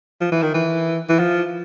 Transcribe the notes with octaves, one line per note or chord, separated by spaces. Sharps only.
F3
E3
D#3
E3
E3
F3